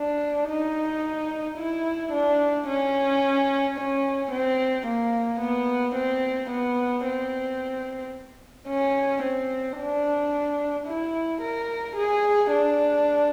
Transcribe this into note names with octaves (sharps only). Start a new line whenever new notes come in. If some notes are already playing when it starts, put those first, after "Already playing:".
Already playing: D4
D#4
E4
D4
C#4
C#4
C4
A#3
B3
C4
B3
C4
C#4
C4
D4
E4
A#4
G#4
D4